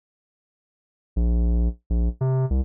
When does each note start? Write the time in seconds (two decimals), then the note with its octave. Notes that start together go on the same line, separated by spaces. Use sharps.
1.16 A#1
1.90 A#1
2.21 C3
2.50 C2